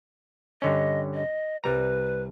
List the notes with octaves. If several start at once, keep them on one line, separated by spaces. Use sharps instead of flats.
G2 D3 C#4 D#5
D#5
C2 G3 B4 A#5